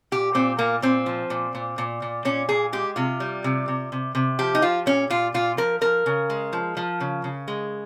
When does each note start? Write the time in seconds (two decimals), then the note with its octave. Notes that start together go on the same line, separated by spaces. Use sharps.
0.12 A#2 G4
0.35 A#2 C4
0.59 A#2 A#3
0.82 A#2 C4
1.06 F3
1.30 A#2
1.55 A#2
1.78 A#2
2.02 A#2
2.25 A#2 C#4
2.49 A#2 G#4
2.73 G#3 G4
2.96 C3 F4
3.20 G3
3.44 C3
3.68 C3
3.92 C3
4.15 C3
4.39 F3 G4
4.55 D#4
4.62 F3 F4
4.86 A#2 C#4
5.10 A#2 F4
5.34 A#2 F4
5.57 F3 A#4
5.81 F3 A#4
6.06 C#3
6.30 G#3
6.53 F3
6.77 F3
7.00 C#3
7.24 C#3
7.48 G#3